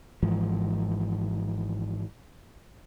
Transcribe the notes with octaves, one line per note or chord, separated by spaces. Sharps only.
G#1 G#2 E3 F3